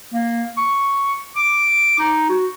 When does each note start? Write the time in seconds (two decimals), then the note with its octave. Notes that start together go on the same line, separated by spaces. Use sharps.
0.13 A#3
0.57 C#6
1.36 D6
1.99 D#4
2.29 F#4